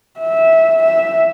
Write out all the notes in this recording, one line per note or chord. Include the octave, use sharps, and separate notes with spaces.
E5
E5